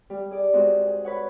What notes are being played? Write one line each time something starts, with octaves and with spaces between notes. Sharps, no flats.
G3
G#4 D5
G#3 C4 F#4 G#4
G#4
B4 C#5 F#5